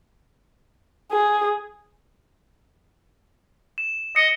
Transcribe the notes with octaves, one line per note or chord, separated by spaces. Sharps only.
G#4
E7
D#5 C#7